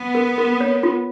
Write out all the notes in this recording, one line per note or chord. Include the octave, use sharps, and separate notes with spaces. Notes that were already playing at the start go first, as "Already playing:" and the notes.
Already playing: B3
A#4
A#4
C#5
F4